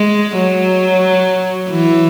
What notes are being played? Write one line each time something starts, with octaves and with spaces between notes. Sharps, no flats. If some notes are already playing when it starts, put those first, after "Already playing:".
Already playing: G#3
F#3
E3